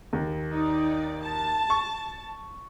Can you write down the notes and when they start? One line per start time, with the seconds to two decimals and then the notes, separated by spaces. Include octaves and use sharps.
0.13 D#2
0.52 D#4 D5
1.23 A5
1.70 C#6